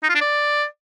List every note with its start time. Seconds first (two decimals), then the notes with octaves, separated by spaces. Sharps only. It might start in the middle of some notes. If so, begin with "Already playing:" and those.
0.03 D#4
0.09 F4
0.15 D4
0.21 D5